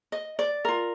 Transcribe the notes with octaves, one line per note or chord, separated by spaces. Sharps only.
D#5
D5
F4 A#4